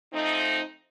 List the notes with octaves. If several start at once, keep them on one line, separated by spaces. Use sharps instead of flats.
F3 A3 C4 D#4